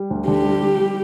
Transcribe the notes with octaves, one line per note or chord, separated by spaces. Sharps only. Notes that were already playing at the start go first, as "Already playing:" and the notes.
Already playing: G3
D2
D3 G4
G3
G3
G3